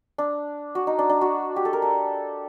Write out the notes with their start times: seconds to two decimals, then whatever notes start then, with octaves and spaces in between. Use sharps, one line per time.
0.18 D4
0.75 F#4
0.87 D#4
0.99 D4
1.10 D4
1.21 F#4
1.56 G4
1.65 A4
1.73 A#4
1.82 A4